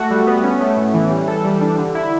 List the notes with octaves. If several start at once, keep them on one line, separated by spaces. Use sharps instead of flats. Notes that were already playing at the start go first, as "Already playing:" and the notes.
Already playing: A3 F#4 A4
G3
B3
C#4
A3
A2
E3
G3
A4
G3
D4
D3
E4